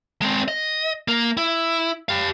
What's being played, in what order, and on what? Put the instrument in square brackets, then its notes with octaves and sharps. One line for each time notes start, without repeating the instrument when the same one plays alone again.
[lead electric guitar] G#3 C4
D#5
A#3
E4
G4 F5